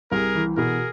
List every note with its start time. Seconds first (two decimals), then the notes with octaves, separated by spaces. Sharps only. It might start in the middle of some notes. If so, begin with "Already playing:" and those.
0.12 C2 G#4 A#4
0.35 E3
0.57 B2 G#4 A#4